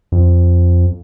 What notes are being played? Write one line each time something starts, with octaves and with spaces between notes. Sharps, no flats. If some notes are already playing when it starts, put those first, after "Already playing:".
F2